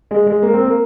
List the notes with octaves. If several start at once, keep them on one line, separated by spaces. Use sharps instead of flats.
G#3
G#3
A#3
C4
A#3